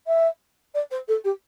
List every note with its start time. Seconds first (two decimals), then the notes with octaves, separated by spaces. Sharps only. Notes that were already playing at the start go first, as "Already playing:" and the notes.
0.07 E5
0.74 D5
0.90 C5
1.08 A4
1.24 G4